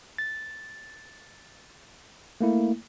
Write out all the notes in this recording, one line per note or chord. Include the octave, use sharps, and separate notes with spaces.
A6
A3 A#3 E4